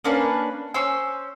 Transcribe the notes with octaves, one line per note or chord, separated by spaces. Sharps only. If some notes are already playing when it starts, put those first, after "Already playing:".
A#3 C#4 D4 B4
C#4 C5 E6